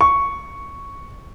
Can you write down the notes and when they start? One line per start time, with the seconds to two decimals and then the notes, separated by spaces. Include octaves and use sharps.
0.01 C#6